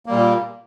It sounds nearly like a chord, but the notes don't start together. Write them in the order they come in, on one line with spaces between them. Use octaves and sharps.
A#3 G3 A#2